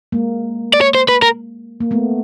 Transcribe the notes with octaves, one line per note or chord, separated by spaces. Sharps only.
G#3 A#3
D5
C#5
C5
B4
A#4
A#3
A3 B3